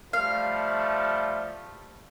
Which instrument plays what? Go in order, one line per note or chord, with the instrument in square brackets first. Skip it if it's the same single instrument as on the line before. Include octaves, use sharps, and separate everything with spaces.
[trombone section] F3 G3 A3 [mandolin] F5